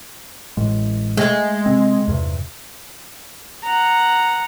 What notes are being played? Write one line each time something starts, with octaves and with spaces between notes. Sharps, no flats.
A1 A2 G#3
G#3 A3
C3 C4
E2 G2 C3
F#5 A#5